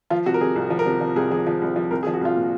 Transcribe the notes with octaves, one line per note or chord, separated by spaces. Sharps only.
F3 F4
C3 F#4
A#4
C3 G#4
C2
F3
A#4
C3
F3
C2 G#4
F3 G#4
F3
C2
F3
C2 A#4
G#4
F3
F#4
C2 F4
A#2